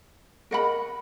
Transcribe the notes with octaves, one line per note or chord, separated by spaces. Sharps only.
A#4 D#5 F#5 B5